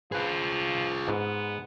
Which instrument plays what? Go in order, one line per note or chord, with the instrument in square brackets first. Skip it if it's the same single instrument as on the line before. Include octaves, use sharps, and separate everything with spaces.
[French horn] F3 [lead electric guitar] F4 G#4 [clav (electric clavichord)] B4
[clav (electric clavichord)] G#2 [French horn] B3